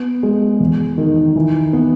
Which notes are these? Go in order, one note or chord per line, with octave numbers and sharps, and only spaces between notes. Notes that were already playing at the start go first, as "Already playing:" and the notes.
Already playing: B3
G#3
E2
D#3
E3
B3